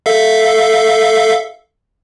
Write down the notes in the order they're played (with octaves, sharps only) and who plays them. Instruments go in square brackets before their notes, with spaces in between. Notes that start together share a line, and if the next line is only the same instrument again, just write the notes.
[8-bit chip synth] A4 E5 F5